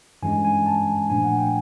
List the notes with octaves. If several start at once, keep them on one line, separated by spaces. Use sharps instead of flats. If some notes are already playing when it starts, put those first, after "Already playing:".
G2 E3 G#3 C#4 G#5
G#5
A5
A#2 F3 A3 D4 G#5
F#5
G5